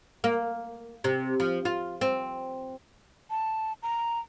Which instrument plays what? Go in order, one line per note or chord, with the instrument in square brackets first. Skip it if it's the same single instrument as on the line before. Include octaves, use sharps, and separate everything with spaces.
[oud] A#3
C3
F3
F4
C4
[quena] A5
A#5